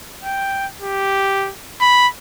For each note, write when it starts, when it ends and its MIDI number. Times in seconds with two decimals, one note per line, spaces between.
0.24 0.67 79
0.81 1.51 67
1.81 2.08 83